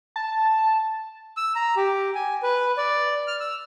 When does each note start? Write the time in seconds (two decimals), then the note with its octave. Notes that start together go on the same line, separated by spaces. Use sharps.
0.16 A5
1.37 E6
1.55 A#5
1.77 G4
2.15 G#5
2.43 B4
2.78 D5
3.28 F6
3.40 E6